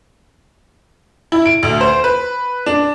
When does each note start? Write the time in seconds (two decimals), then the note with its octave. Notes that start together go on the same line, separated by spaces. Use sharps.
1.32 E4
1.46 D7
1.63 D2
1.81 C5
2.04 B4
2.66 D4